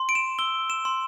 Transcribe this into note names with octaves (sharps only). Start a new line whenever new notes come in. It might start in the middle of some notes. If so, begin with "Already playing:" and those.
Already playing: C6
D7
E7
E6 G7
E7
C6